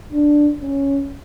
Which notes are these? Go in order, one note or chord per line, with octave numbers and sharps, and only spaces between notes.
D4
C#4